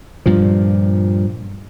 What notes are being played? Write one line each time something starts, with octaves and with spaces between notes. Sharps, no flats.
G2 A#2 F3